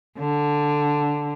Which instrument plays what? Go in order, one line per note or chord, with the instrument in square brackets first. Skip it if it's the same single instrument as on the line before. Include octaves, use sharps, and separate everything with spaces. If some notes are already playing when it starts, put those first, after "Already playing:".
[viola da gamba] D3